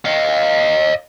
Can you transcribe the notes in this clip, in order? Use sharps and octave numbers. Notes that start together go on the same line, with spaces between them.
D#5 F5